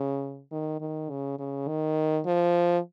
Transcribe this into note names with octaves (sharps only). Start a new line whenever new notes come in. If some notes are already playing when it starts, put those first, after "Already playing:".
Already playing: C#3
D#3
D#3
C#3
C#3
D#3
F3